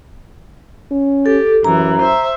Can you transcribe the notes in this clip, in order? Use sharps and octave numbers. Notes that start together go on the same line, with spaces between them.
C#4
G4 A4
F#2 E3 A#5
C5 E5